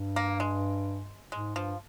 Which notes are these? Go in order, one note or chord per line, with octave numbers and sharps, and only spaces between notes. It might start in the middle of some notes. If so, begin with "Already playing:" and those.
Already playing: G2
A#3
G#3
G#2 G#3
G2 F3